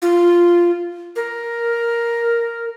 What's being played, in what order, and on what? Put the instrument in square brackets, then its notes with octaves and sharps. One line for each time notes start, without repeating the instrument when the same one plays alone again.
[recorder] F4
A#4